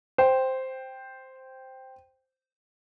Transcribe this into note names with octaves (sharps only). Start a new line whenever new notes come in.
C5 G5